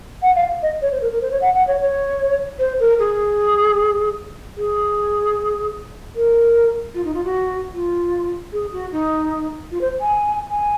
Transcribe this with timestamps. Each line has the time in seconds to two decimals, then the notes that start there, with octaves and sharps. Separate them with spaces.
0.22 F#5
0.35 F5
0.62 D#5
0.81 C#5
0.91 C5
1.01 A#4
1.11 A#4
1.21 C5
1.31 C#5
1.41 F#5
1.54 F#5
1.67 C#5
1.80 C#5
2.59 C5
2.79 A#4
2.98 G#4
4.57 G#4
6.15 A#4
6.94 F4
7.04 D#4
7.14 F4
7.24 F#4
7.74 F4
8.52 G#4
8.72 F#4
8.92 D#4
9.71 F4
9.81 C5
10.01 G#5
10.50 G#5